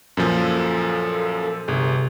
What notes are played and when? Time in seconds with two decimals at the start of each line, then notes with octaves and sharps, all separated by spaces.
0.17 F#2 A#2 F3 A4
1.68 G1 C3 G#4